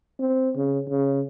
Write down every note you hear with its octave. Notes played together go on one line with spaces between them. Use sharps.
C4
C#3
C#3